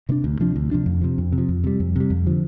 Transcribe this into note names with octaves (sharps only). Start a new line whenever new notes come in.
C3 A#3 D4
D2
C3 F3 D4
D2
C3 F3 D4
F2
C3 F3
F2
C3
F3
F2
C3 G3
F2
C3 G3
F2
D3 F3